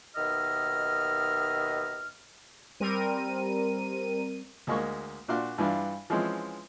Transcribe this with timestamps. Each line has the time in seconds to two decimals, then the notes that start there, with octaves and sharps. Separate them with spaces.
0.16 D#2 B2 D#3 D#5 E5 F6
2.80 G3 C4 A#4 D#7
4.67 D2 G#3 A#3 C#6
5.28 A#2 D4 F#4 F5 C6 D6
5.58 G2 E3 D4 F4 F5
6.10 E3 F3 G#3 C4 C#4